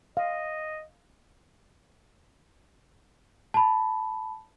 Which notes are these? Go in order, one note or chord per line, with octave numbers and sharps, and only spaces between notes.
D#5 F5
A5 B5